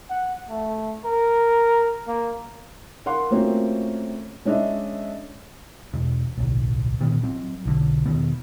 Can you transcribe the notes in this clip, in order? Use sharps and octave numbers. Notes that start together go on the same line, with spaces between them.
F#5
A3
A#4
A#3
A#4 F5 F#5 C6
A3 A#3 C4 C#4 F4 F#4
G#3 C#4 D4 D#5 E5
E1
D1 B1
A#2 D#3 B3
F#3 C4
B1 D3
E1 D#3 B3